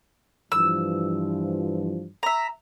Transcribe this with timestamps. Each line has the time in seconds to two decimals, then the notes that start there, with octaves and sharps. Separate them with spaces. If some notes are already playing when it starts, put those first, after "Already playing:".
0.52 G2 E3 F3 E6
2.23 E5 A#5